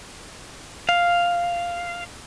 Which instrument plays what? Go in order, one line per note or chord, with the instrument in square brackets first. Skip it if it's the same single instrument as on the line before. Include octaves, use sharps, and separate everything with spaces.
[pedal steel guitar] F5